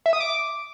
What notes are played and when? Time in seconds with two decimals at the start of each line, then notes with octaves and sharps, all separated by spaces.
0.06 E5
0.13 D#6
0.20 D6